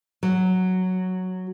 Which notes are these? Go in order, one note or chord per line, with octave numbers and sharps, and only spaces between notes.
F#3